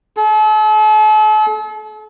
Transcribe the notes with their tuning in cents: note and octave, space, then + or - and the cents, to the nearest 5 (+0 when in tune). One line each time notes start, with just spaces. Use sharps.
A4 -40